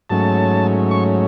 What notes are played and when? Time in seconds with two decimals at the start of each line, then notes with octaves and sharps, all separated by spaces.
0.10 G#2 F#3 A3 C#4 A5
0.91 C#6